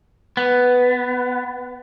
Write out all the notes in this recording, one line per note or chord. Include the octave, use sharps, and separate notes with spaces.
B3